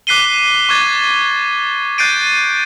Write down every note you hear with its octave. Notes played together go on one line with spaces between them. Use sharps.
D6 F#6 B6 C7 D#7 G7
C#6 D6 F#6 G#6 A6
F#6 G6 A6 C7 D7 D#7